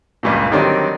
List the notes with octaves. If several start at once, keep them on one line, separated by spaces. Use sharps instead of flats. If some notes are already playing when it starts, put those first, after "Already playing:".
C#2 G2 A#2
D3 D#3 F#3 G3 C4 D4